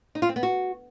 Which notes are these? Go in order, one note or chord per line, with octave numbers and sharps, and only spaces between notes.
D#4
F4
C4
B3
F#4